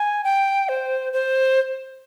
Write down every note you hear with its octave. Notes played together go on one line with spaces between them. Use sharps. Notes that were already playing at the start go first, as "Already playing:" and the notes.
Already playing: G#5
G5
C5
C5